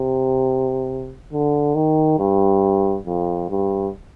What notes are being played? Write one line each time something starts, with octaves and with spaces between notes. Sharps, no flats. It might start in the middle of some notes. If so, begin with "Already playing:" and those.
Already playing: C3
D3
D#3
G2
F2
G2